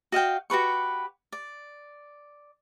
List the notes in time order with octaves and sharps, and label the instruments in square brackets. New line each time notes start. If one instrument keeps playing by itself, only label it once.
[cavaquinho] F#4 D#5 F5 G5
F#4 G4 B4 C#6
D5